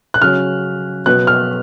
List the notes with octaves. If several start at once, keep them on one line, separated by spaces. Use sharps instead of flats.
F#6
C#3 F#3 C#4 F6
B2 F#3 B3 F#6
F6